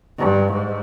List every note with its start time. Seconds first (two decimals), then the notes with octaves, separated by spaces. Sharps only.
0.18 G2
0.52 G#2